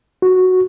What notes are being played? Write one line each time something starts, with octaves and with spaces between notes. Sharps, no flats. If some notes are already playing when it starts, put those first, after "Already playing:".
F#4